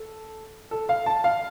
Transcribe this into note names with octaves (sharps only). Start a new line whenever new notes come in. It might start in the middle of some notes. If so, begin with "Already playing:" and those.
Already playing: A4
A4
F5
A5
F5